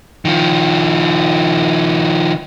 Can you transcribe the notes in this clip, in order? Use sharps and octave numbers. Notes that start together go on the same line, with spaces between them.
D#3 F3